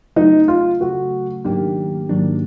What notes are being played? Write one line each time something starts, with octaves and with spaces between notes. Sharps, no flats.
C#3 F#3 A3 D#4
F4
C#3 F#3 A3 F#4
G#2 D#3 F#3 A#3 D4 G4
G#2 D#3 F#3 A#3 D4